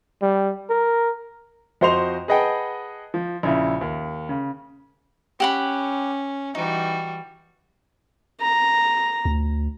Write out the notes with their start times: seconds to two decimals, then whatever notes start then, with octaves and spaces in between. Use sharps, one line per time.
0.22 G3
0.70 A#4
1.81 F2 F#4 C5 D#5 C6 F7
2.28 G#4 B4 D#5 F#5 G5 A5
3.14 F3
3.43 A#1 C#3 E4
3.81 D#2
4.29 C#3
5.40 C#4 G4 F#5 B5
6.55 E3 G3 D#4 F#4
8.41 A#5
9.25 D2